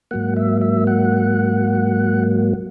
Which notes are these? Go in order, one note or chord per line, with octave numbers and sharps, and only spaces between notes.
G#2 F#3 A#3 F#5
E5
E5
F#5